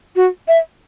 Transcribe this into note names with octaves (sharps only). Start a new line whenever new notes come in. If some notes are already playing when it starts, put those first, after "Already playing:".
F#4
E5